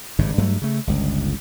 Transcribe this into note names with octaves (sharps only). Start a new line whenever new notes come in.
G#1 G2 C#3
G2 F#3 A3
C#3 A3
G1 C#2